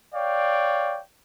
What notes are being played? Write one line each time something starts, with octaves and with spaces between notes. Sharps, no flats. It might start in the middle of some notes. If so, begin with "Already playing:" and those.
C#5 D5 F5 G5